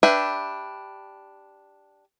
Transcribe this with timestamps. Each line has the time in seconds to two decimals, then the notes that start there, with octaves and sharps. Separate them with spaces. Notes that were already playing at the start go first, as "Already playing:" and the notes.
0.03 D4 G4 B4 E5